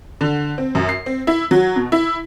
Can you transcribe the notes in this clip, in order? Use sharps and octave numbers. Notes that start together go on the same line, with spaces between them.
D3
C4
F#2
C7
C4
E4
F#3
B2
E4